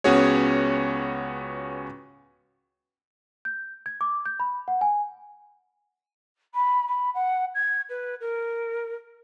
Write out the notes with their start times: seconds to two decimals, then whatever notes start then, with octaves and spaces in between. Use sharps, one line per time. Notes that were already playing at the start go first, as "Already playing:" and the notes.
0.04 C#2 B3 C#4 F#4 G#4 C#5
3.45 G6
3.86 G#6
4.01 D6
4.26 G6
4.40 B5
4.68 F#5
4.81 G#5
6.54 B5
6.87 B5
7.14 F#5
7.54 G#6
7.89 B4
8.20 A#4